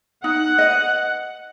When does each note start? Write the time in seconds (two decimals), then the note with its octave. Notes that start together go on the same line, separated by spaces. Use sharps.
0.24 D#4 F#5
0.58 B4 D#5